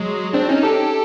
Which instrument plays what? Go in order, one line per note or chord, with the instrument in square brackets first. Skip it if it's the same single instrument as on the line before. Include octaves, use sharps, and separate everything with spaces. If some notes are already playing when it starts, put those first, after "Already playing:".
Already playing: [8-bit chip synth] F#3 G#3
C4 D4
C#4 D#4
G4 A4